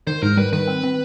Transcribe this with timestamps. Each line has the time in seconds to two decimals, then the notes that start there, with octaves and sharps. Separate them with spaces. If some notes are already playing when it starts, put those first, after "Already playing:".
0.07 D#3 C5
0.23 G#2 A#4
0.37 G3 B4
0.53 D#3 B4
0.68 C4
0.84 C4